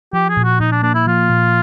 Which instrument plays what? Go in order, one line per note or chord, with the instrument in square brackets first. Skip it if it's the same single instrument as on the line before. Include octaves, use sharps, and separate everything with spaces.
[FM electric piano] F3 [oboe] G4
[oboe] G#4
[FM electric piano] A#2
[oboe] F#4
[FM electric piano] A#2 [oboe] D#4
[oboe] D4
[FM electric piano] A#3 [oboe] D4
[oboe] E4
[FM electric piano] F3 [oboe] F4
[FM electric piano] A#2